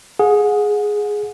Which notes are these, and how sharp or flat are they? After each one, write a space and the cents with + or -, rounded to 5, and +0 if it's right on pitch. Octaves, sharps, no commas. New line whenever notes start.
G#4 +5 F#5 -35